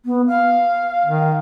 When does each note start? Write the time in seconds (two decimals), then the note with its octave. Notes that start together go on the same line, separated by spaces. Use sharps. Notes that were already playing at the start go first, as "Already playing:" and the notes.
0.05 B3
0.28 F5
1.06 D#3